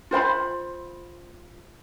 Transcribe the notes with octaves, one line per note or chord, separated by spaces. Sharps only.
F4 C5 F#5 B5